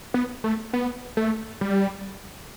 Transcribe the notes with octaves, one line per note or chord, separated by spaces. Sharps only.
B3
A3
B3
A3
G3